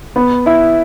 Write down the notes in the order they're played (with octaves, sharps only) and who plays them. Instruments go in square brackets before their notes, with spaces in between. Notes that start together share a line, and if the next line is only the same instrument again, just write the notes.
[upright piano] B3
E4